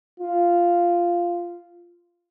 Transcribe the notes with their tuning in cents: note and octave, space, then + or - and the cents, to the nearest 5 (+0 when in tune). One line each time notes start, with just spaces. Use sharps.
F4 -5